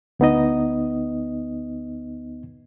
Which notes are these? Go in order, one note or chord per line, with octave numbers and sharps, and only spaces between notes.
D2 B3 D#4 D#5